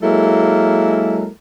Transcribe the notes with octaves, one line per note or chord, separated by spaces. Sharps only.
F#3 G#3 A#3 E4 A4 A#4